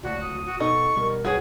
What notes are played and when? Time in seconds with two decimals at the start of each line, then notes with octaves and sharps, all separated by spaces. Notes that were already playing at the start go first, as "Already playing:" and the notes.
0.03 D1 C#2 A2 F#4 D5
0.22 D#6
0.46 F#4
0.60 B2 D#4 A4 D#5 C#6
0.96 B2 G3 A#4
1.25 D1 B1 G2 F#4 G#4 B4 C#5 F#5